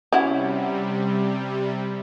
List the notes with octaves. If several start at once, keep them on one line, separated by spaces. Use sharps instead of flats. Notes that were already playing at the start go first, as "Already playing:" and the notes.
C3 G3 C#4 E4 F#4